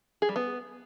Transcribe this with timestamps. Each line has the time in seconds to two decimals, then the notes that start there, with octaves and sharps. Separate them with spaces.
0.22 G#4
0.29 G3
0.36 B3